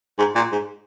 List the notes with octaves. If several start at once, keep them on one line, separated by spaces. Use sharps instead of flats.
G#2
A#2
G#2